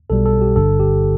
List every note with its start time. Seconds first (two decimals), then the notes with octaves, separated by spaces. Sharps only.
0.10 B1 B2 G3 A4
0.26 A4
0.41 G4
0.56 G1 G2 D3 A4
0.80 G4